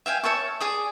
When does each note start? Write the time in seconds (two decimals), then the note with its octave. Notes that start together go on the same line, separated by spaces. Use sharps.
0.06 E5 F5 G5 G#5
0.23 C#5 E5 A5 C#6
0.60 G#4 D5 D#6